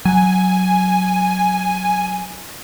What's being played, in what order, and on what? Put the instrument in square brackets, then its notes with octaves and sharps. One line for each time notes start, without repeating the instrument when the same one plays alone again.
[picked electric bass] F#3 [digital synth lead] G#5